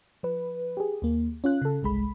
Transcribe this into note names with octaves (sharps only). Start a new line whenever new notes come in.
F3 B4
G4 G#4
D#2 A#3
C#4 F4 F#6
C#3 A4
G1 C2 G#3 B5